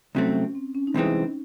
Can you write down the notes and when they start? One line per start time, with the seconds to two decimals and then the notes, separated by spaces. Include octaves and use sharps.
0.15 C2 C3 F#3 A3 C4 C#4
0.35 C#4
0.55 C4
0.75 C#4
0.87 D#4
0.94 C2 C3 E3 G#3 C4 C#4
1.15 C#4